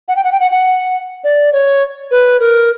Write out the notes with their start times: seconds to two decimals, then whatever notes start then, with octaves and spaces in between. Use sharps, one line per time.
0.08 F#5
0.16 G5
0.24 F#5
0.32 G5
0.40 F#5
0.51 F#5
1.24 D5
1.53 C#5
2.11 B4
2.40 A#4